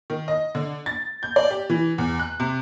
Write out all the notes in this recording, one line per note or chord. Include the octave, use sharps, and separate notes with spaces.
D#3
D#5
D3
A6
G6
D5
G4
E3
E2
F#6
C3